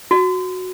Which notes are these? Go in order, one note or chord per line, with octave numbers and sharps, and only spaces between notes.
F#4